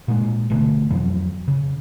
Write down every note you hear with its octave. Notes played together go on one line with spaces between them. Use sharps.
A#2 G#3
G1 B2 D3 A3
F2 E3 F#3
C#3